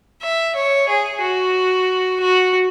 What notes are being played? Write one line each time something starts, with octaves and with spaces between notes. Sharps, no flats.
E5
C#5
G#4
F#4
F#4